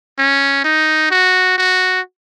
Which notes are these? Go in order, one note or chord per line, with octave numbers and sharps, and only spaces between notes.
C#4
D#4
F#4
F#4